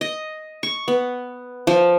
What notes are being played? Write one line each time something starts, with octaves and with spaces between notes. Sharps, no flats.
D#5
C#6
B3
F3